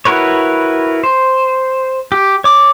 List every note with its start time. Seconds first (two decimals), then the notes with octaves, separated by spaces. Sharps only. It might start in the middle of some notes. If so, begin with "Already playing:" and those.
0.05 E4 F#4 A#4 B4 C#5
1.04 C5
2.12 G4
2.44 C#5 D6